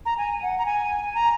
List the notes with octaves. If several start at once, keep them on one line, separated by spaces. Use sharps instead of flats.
A#5
G#5
F#5
A#5
G#5
A#5